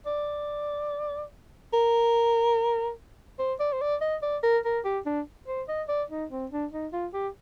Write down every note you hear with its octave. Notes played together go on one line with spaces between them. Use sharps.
D5
A#4
C5
D5
C5
D5
D#5
D5
A#4
A#4
G4
D4
C5
D#5
D5
D#4
C4
D4
D#4
F4
G4